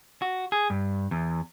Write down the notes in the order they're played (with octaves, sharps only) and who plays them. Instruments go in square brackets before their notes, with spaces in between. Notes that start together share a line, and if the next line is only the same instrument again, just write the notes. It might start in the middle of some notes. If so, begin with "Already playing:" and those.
[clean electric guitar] F#4
G#4
G2
E2